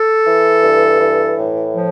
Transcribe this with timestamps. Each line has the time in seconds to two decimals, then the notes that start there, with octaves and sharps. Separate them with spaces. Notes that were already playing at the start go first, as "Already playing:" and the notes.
Already playing: A4
0.27 E3
0.63 G2
1.01 E3
1.37 A2
1.73 F3